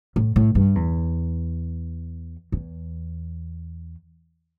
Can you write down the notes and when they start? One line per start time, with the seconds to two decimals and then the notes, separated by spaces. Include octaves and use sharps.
0.16 A2
0.36 A2
0.55 G2
0.75 E2
2.52 E2